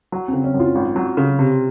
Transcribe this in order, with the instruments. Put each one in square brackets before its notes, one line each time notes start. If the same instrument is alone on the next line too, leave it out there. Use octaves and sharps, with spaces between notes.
[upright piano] F#3
[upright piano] C#3 [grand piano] C4
[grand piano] C#4
[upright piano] F#2
[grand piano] F4
[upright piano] G#1
F#3
C#3
C3